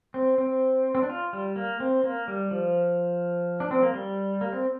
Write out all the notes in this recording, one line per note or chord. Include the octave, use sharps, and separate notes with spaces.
C4
C4
C4
D4
F4
G3
A#3
C4
A#3
G3
F3
D4
C4
A#3
G3
A#3
C4